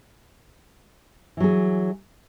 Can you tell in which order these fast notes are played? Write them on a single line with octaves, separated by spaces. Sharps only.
E3 F#3 G#4